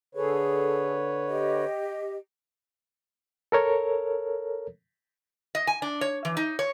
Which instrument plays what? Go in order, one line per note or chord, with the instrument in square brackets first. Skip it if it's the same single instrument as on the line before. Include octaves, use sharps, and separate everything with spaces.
[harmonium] D3 B4 C#5 [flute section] G#4 A4
[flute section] G4 D#5
[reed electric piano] A4 A#4 C#5
[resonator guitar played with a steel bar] D#5
G#5
D4
C#5
E3
D#4
C#5